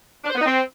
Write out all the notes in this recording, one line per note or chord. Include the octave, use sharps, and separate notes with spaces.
D4
C5
B3
D#4
C4